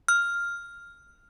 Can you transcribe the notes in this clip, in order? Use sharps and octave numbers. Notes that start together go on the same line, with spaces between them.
F6